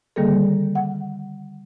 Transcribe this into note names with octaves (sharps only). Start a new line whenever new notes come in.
D3 D#3 G3 A#3 G#4 A4
F#5